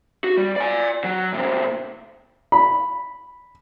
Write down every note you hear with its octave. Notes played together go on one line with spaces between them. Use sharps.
F#4
G3
D5 G#5
F#3
A2 C3
B5